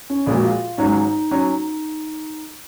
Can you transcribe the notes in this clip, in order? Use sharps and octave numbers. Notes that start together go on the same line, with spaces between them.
C#4
A#1 A#2 G#3 F4
F#4
F4
G#1 G#2 F#3 C#4 D#4
F#3 C#4